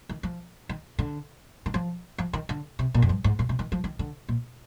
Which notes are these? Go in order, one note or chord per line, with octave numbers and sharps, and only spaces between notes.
D#3
F3
D#3
D3
D#3
F3
F3
D#3
D3
C3
A#2
F2
G2
G#2
A#2
C3
D#3
F3
D#3
D3
A#2